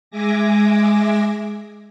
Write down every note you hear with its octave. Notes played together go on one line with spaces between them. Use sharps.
G#3 E5 G#5 D6 A#6